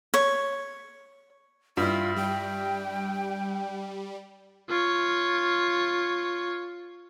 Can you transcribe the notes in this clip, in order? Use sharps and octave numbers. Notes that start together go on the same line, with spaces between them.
C#5
G2 E4 F4
G3 G5
F4 C#5